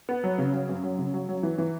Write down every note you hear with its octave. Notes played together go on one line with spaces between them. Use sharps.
B3
F#3
C#3
F#3
F#2
F#3
C#3
F#3
F#3
E3
E3